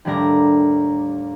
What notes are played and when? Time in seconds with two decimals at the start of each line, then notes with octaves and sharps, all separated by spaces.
0.05 D#2 A2 G3 D4 A#4 A#6